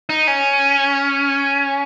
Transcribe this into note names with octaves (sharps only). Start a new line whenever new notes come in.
D#4
C#4